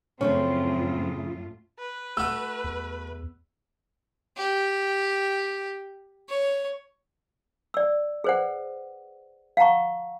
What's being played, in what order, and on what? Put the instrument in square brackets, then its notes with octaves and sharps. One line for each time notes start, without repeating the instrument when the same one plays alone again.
[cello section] F#2 A2 F4 [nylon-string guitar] C#3 F3 A3 [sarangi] C4 [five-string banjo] C#4
[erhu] B4
[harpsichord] A3 F#4 [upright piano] E6
[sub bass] E2
[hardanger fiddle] G4
C#5
[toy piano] D5 E6
G#4 B4 C5 D5 F#5
F5 F#5 A5 A#5 C#6